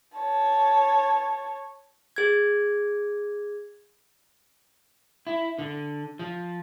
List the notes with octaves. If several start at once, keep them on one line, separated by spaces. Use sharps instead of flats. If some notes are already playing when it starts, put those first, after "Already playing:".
C#5 A5
G#4 G#6
E4
D3
F3